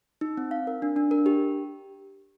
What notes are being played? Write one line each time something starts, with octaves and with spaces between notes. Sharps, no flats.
D#4
C4
F5
A#4
D4
D4
A#4
G4